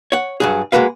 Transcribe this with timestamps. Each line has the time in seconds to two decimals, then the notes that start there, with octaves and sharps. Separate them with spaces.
0.12 C#5 F#5
0.40 G2 F#3 G#4
0.72 G#3 A#3 F#4 B4 F5